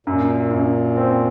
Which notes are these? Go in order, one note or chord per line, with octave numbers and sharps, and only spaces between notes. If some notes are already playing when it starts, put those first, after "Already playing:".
F#2 A#2
F#2
C4